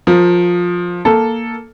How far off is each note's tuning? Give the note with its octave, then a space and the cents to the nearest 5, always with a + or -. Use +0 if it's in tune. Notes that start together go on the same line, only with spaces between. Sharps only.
F3 +15 A#4 +0
A#3 +0 A4 +0